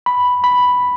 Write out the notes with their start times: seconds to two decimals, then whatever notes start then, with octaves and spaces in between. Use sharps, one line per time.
0.06 B5
0.44 B5